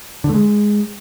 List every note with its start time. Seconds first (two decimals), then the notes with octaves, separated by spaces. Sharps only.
0.24 D3
0.29 A3
0.34 G#3